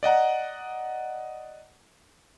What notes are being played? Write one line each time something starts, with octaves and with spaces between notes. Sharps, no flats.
D5 D#5 F#5 A#5